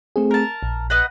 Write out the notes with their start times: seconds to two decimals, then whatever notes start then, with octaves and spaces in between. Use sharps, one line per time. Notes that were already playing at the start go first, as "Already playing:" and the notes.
0.16 A3 C4 G#4
0.31 A#4 A5
0.63 A#1
0.90 B4 D#5 F#5